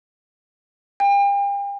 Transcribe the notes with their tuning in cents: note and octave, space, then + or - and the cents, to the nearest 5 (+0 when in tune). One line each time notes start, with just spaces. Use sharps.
G5 +40